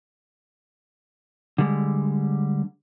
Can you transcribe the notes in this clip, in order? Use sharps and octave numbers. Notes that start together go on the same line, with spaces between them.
D3 G3 G#3